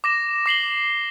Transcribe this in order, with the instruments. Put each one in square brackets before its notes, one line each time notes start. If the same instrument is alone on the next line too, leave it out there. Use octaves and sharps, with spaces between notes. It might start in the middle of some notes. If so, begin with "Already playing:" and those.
[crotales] D6 A#6 E7
D6 C7 F#7 G7